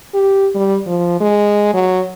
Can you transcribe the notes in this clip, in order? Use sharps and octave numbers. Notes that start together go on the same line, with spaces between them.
G4
G3
F3
G#3
F#3